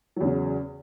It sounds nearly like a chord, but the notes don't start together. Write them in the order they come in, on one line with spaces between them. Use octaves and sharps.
F#3 E2 C#3